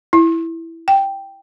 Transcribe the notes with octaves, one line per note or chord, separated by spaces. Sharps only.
E4
G5